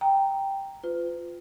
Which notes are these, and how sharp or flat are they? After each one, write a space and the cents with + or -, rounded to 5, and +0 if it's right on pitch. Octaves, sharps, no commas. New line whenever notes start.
G5 +0 A#5 +0
F4 +0 B4 +40